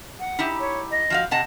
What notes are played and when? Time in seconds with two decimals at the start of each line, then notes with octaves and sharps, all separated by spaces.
0.20 F#5
0.39 D#4 E4 G4
0.60 C#5
0.91 D#5
1.10 F3 F#4 F5
1.31 C3 D#5 F#5 A5